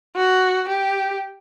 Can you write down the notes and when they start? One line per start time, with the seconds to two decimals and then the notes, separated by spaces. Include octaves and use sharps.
0.16 F#4
0.68 G4